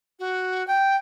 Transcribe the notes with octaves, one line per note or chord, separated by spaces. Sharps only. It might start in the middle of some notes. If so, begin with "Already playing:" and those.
F#4
G5